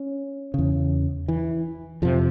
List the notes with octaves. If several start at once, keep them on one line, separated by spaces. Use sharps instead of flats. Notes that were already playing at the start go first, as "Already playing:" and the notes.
Already playing: C#4
E2 C#3
E3
F2 C3 F3